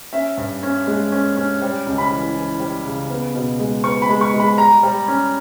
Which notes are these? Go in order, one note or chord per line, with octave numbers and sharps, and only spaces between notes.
C#4 E5
G2
C#4
G#3
C#4
C#4
G3
C#2
B5
E3
E3
G3
C#3
B3
B2
G#3
B3 C#6
B5
G#3
C#6
G#3
B5
G3 A#5
G3
C#4